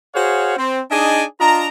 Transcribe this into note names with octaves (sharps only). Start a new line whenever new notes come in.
F#4 G#4 C5 C#5 F5 F#5
C4
D4 D#4 G#4 D5 D#5 G#5
D4 F4 D#5 A#5